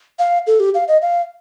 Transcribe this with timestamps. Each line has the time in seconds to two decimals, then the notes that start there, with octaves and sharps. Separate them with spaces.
0.19 F5
0.47 A4
0.60 G4
0.75 F5
0.88 D#5
1.02 F5